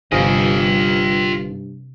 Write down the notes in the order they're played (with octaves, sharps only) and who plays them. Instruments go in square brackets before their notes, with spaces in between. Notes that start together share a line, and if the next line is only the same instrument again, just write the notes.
[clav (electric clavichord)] G1 F3 G#4 [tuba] G2 [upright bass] C3 [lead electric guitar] F4 D#5